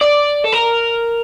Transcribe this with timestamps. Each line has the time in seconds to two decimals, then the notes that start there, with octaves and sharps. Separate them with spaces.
0.01 D5
0.44 A4
0.53 A#4